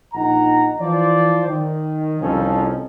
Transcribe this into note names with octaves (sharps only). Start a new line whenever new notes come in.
A#1 D#4 F#5 A#5
E3 F3 C5 D5
D#3
C2 F2 F3 C#4 D#4 A4